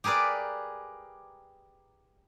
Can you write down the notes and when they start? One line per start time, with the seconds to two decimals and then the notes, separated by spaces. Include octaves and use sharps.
0.04 G4 G#4 A#4 B4 D5